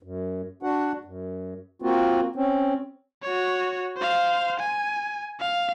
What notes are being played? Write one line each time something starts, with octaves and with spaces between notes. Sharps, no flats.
F#2
D4 F#4 F#5
F#2
A#3 C4 F4 F#4
C4 C#4
F#4 C#5
C5 F5
G#5
F5